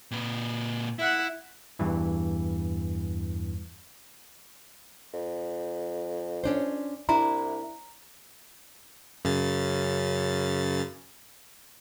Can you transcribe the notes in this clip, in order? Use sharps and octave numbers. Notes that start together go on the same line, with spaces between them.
A#2 B4
E4 E5 F#5
E2 G2 E3
F2
C#4 D4 C5
C2 D4 E4 A#5
F#2 C#3 A6